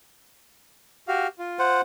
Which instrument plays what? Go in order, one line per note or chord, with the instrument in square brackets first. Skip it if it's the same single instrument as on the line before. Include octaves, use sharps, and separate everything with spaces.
[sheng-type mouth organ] F#4 G4 F5
F4
[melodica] C5 F#5